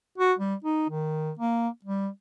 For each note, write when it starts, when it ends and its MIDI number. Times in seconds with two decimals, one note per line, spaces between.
0.18 0.33 66
0.39 0.55 55
0.64 0.88 63
0.89 1.31 51
1.39 1.68 58
1.84 2.08 55